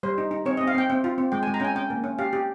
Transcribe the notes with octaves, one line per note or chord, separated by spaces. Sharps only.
G3 C5
D#4
D#4
C4 C#5
C4 D#5
F5
C4 G5
C4
F4
C4
G#3 G5
G#3 G#5
A#5
C#4 G5 G#5
C#4 G5
A#3
C#4
G4 F5
G4